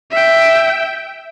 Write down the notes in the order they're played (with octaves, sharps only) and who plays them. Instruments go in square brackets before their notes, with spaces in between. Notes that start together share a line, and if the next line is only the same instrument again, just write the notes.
[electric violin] E5 G5